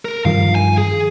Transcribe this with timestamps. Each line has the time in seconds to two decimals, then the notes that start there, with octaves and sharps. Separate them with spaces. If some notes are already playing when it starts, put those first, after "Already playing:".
0.05 A#4
0.25 G2 D#3 F3 F5
0.55 G#5
0.78 G#4